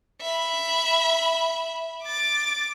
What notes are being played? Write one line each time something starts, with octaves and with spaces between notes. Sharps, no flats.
E5 B5
D6 A6